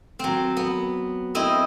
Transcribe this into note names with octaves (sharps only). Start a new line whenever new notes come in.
F#3 C4
B3
C4 E4 D#5